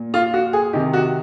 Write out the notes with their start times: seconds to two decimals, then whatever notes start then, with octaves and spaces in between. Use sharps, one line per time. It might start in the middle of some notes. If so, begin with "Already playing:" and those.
Already playing: A#2
0.14 F4
0.34 F#4
0.53 G#4
0.73 C3 D#3 G4
0.93 F#4